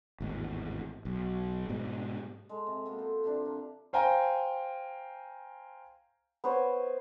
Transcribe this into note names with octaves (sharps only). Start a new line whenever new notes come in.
G#1 E2 A2
B1
G#2 B2 G3
G#3 A4
C3
A#3 B3 F#4 A4
A4 C5
C3 F3 D4
A#4
C5 F5 G5 G#5 A#5
B3 C5 C#5